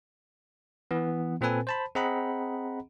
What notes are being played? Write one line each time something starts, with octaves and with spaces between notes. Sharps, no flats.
E3 B3
A#2 C4 A4 B4 G#5
C5 A5 B5
C4 G#4 D#5 F#5 A#5 B5